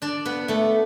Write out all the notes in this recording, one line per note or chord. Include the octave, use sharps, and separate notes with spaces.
D4 D5
B3 B4
A3 A4